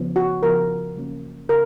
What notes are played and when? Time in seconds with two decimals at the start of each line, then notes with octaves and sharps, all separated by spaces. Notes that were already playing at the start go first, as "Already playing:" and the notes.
Already playing: C#3 F3 B3
0.16 F#4
0.43 C#3 F3 B3 A#4
0.96 C#3 F#3 A#3 C#4
1.49 C#3 A#4